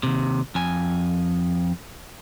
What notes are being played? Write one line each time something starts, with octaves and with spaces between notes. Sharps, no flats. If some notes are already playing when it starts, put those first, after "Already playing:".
D#2 C3
F2 G#5